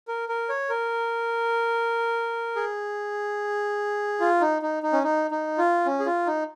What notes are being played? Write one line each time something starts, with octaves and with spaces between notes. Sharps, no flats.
A#4
A#4
C#5
A#4
G#4
F4
D#4
D#4
D#4
C#4
D#4
D#4
F4
C#4
G#4
F4
D#4